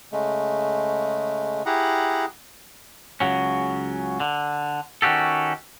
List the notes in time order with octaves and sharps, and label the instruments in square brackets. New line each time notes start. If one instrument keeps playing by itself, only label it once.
[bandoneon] C#3 G#3 A3
E4 G4 G#4 F#5 A#5
[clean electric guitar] C#2 A2 C#3 F#3 C#4
D3
D#3 C#4 F#4 G4 A4